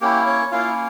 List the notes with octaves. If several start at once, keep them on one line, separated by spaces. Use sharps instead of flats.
A#3 C#4 E4 G4
C#4 C#5
A#3 C#4 E4 F4 F5